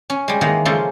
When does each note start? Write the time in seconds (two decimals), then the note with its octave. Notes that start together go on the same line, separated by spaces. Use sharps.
0.10 C#4
0.28 G3 G#3
0.41 D#3 E3 G#3 A#3 F#5 A#5
0.65 C#3 F3 G#3 A#3 F4 A4